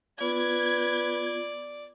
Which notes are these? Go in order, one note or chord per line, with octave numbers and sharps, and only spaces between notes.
B3 F4 B4 D5 G#6